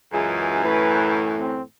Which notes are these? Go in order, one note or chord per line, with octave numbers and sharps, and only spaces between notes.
C#2 F#2 E3 G#4
A2 B4
C4